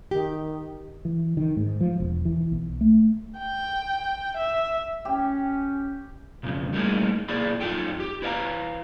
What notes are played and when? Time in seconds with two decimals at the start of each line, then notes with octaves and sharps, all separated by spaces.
0.11 D#3 G4
1.05 E3
1.37 D#3
1.57 G#2
1.81 F3
2.00 E1
2.25 E3
2.52 B1
2.81 A3
3.38 G5
4.36 E5
5.05 C#4 G4
6.43 B1 F2 C#3
6.73 G3 A3 A#3 D#4 E4 G#4
7.29 B1 A#3 E4 G#4 D5 B5
7.61 F#2 F#3 D#4 F4 A4 G5
8.00 G4
8.22 E4 B4 D5 E5 F5 A#5